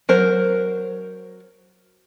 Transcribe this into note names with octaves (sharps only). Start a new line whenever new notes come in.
F#3 A#4 C5